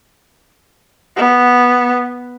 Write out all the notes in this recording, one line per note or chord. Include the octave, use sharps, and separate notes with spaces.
B3